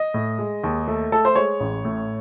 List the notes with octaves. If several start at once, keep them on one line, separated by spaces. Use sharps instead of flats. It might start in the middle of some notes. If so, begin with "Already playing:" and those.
Already playing: D#5
A2
G#3
D#2
A3
A3 A4
C5
G#3 C#5
A1
A2